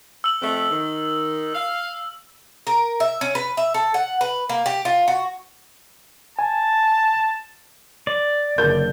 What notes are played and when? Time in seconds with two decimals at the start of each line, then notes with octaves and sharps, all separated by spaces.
0.24 E6 F#7
0.42 F2 A3 C4
0.71 D#3
1.55 F5
2.67 A#4
3.00 E5
3.21 C#4
3.35 B4
3.57 E5
3.74 A4
3.94 F#5
4.21 B4
4.49 A#3
4.66 G4
4.85 F4
5.08 F#4
6.39 G#5 A5
8.07 D5
8.58 F#1 D3 A#4 G6